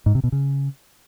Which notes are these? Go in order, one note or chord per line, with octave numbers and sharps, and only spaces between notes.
G#2
C3
B2
C#3